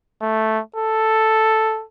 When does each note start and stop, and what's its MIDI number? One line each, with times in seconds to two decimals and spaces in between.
0.21 0.60 57
0.76 1.84 69